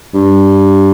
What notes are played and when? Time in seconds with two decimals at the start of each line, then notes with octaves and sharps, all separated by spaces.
0.14 G2